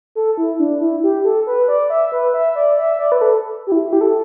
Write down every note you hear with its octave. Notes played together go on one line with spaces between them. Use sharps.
A4
E4
D4
E4
G4
A4
B4
D5
E5
B4
E5
D5
E5
D5
B4
A4
G4
E4
E4
G4
A4